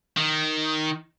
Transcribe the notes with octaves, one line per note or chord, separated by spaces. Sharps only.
D#3